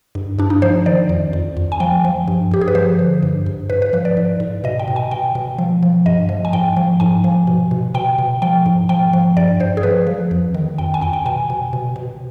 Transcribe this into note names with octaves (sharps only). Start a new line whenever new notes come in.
G2
G2 D4
D#4
F3 C5
D#3 D5
F2
F2
F2
G#5
F3 G5
F3
G2
G2 G4
G#4
B4
F3 C5
D3
G2
G2
G#2 B4
B4
F3 B4
D5
G#2
G#2
B2 D#5
G5
B2
G#5
B2 G5
B2
F3
F3
G2 D#5
F3
G#5
G#2 G5
F3
G#2 G#5
F3
B2
B2
B2 G5
B2
F3 G5
G#2
F3 G5
F3
G2 D5
G2 C5
G#4
F3 B4
F3
F2
D#3
F2 G5
G#5
F2 G5
G5
B2 G#5
B2
B2
B2